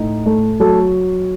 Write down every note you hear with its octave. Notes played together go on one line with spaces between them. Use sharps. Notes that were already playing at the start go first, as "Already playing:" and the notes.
Already playing: A2 D#4
A3
F#3 A4